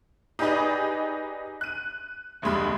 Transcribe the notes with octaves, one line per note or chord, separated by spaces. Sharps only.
D#4 G4 G#4 B4 D5 D#5
F#6 D#7
F1 D2 G3 G#3 B5